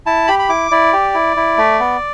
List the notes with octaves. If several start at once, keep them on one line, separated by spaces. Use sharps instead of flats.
E4 A5
G4 B5
B5
E4 D6
E4 D5
G4
E4
E4
A3
B3